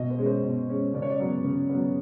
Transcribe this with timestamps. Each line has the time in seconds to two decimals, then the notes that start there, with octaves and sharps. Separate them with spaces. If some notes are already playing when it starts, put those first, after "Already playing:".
Already playing: B2 D#5
0.10 C5
0.19 G#3 C#4
0.26 C5
0.43 B2
0.69 G#3 C#4
0.94 C#3 D5
1.02 C#5
1.10 D5
1.20 F#3 B3
1.44 C#3
1.70 F#3 B3